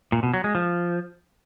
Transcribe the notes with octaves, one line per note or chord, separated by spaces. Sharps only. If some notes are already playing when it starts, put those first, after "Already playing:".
A#2
B2
F#3
G#3
F3